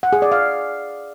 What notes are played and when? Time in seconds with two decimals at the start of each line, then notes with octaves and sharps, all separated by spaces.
0.03 F#5
0.13 G#4
0.22 D5
0.32 F5